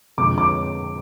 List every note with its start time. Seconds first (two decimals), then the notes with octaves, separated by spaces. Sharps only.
0.18 F2 D3 G#3 D6
0.38 D6